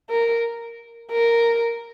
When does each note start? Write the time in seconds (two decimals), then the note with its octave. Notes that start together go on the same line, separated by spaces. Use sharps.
0.10 A#4
1.12 A#4